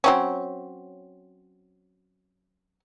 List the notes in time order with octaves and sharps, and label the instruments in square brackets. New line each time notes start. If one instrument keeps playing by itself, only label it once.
[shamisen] F#3 C4 C#4